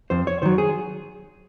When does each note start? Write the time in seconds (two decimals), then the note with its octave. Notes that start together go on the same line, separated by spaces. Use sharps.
0.10 F2 C5
0.27 C#5
0.42 D#3 F#3 C5
0.58 G#4